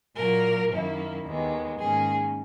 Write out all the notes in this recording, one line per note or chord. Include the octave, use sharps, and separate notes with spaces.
A#2 F#3 A#3 A#4
F#2 D#3 A#3 E4
D#2 D#3 G#3 B3
G#2 D#3 A#3 C#4 G#4